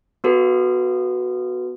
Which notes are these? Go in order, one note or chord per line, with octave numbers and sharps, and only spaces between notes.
B3 F#4 A4 B4